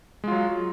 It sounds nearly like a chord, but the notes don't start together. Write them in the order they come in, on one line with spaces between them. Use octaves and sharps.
G#3 F4 F#3